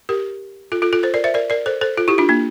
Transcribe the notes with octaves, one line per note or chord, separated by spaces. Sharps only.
G4 A#4
F4 A4
F4 A4
F4 A4
A4 C5
A#4 D5
C5 E5
A#4 D5
A#4 D5
A4 C5
A4 C5
F4 A4
E4 G4
D4 F4
A#3 D4